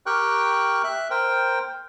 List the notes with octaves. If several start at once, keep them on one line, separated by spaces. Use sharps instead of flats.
G4 A#4 G5 C#6 F#6
E5 F#6
A#4 C5 G5